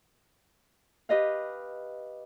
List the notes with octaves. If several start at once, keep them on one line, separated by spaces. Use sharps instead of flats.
G4 B4 D#5 F5